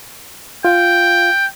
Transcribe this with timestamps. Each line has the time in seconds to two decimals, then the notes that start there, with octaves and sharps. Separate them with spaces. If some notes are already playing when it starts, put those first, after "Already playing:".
0.65 F4 F5 G5